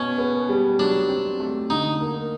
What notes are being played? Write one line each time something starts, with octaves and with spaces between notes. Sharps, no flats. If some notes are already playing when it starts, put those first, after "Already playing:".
Already playing: B2 C#4
B3
G3
F#3 D4
C4
A3
D3 D#4
A#3